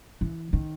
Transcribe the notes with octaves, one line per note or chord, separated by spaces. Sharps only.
E3
D#3